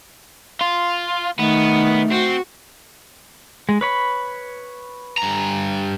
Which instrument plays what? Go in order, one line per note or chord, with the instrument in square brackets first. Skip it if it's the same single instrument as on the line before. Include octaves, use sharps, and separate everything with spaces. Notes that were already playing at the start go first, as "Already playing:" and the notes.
[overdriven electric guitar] F4
[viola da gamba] D#3 [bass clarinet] A3 [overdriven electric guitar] B3
[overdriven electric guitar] C4 [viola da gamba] F#4
[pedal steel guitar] G#3
B4 C#5 B5
[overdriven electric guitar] G2 A#5